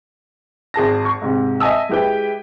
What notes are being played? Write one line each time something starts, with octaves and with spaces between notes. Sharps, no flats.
G#1 G#4 A5 A#6
C#6
G#2 C3
D#5 E5 G#5 A5 D#6 E6
G#3 E4 G4 B4 G5